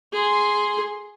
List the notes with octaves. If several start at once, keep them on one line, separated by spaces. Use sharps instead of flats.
G#4 C6